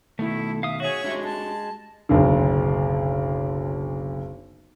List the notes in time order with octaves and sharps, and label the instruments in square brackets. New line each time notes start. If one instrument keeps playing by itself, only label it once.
[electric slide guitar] B2 D#3 [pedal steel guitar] A3 [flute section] E4
[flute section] E5 [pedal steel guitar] F5 D#6
[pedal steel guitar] F#4 G#4 [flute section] C#5 E5 C#6
[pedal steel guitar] G#3 [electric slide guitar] D4 F#4 G4
[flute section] A5
[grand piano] F#1 B1 D3